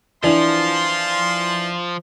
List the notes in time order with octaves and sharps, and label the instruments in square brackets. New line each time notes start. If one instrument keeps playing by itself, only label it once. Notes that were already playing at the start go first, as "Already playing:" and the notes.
[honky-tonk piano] E3 [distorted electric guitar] F3 [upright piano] D4 [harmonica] F5 C6